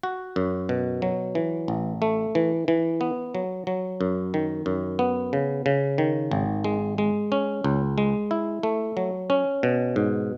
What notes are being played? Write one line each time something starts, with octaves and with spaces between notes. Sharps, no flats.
F#4
F#2
B2
F#3
E3
A1
A3
E3
E3
B3
F#3
F#3
F#2
D#3
F#2
B3
C#3
C#3
D#3
G#1
G#3
G#3
C#4
C#2
G#3
E4
A3
F#3
C#4
B2
G#2